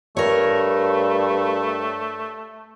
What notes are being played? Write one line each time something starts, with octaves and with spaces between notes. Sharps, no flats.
G2 A3 A#4 C#5